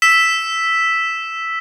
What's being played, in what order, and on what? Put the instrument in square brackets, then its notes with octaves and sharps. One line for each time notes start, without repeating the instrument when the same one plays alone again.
[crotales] E6 B6 E7